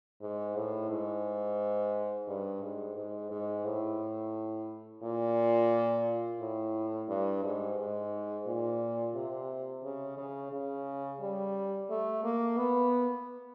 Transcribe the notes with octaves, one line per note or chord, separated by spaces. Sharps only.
G#2
A2
G#2
G2
G#2
G#2
G#2
A2
A#2
A2
G2
G#2
G#2
A#2
C3
C#3
C#3
C#3
G3
A3
A#3
B3